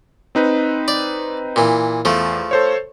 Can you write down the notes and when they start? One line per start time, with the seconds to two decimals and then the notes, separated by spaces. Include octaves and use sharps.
0.35 C4 D#4 B4
0.88 D5
1.56 A#2 E3
2.05 E2 F3 A3
2.51 A4 C5 C#5